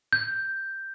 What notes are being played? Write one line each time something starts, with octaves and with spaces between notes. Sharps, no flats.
G6